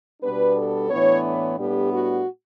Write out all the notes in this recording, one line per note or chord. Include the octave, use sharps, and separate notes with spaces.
B2 G3 B3 D4 B4
A4
A2 E3 B3 D4 C#5
C#5
A2 G3 B3 D4 G4
F#4